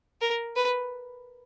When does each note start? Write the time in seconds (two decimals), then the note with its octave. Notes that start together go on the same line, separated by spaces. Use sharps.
0.21 A#4
0.56 B4